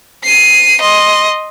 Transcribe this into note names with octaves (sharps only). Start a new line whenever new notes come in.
C7 D#7
D#5 C6